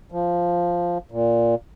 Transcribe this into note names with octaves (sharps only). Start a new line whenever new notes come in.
F3
A#2